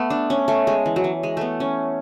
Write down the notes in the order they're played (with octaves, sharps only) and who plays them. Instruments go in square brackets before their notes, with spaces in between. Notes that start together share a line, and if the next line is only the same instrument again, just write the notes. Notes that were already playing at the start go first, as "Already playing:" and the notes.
Already playing: [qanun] A3 B3 A4
D4
C#4
A3
G#3
E3
F#3
E3
G#3
A3 B3
C#4